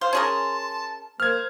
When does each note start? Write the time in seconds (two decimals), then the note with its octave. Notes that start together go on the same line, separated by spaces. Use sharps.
0.01 C5 F5 C6
0.13 C#4 G#4 A#4 A5
1.20 A#3 C5 F6 G#6